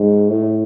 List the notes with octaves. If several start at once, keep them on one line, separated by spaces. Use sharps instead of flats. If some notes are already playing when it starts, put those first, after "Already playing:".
Already playing: G#2
A2